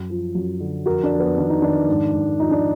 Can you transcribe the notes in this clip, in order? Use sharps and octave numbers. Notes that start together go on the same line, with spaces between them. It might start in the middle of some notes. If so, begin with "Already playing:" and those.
Already playing: F#2
F3
F#2
D3
F2 F#4 A#4
D4
F2
B3
D#3 D4
D#4
D#3 D4
G#2
G#2
F3 D#4
D4